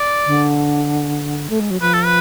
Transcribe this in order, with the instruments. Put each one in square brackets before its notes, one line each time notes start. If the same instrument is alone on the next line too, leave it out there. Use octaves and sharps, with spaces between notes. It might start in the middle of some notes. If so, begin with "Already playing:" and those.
Already playing: [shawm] D5
[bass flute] D3
A3
G#3
F#3
[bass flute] F3 [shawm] B4
[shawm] A4
B4